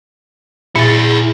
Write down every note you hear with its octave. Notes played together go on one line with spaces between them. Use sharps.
A#2 E4 G#4 A6